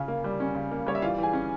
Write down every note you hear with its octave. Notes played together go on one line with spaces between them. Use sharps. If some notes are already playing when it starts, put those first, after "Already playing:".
Already playing: C#3 C#4 F4
A#3
G3
C#4
C#3
A#3
G3 C#5
E5
E3 F4 F5
E3
G#4 G#5
C#4